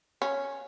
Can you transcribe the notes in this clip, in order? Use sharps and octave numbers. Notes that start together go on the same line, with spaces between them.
C#4